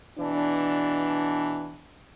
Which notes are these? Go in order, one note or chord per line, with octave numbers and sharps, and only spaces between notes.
B2 E3 D4